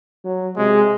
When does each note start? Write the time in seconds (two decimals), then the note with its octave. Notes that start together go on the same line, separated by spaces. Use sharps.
0.24 F#3
0.57 C3 G#3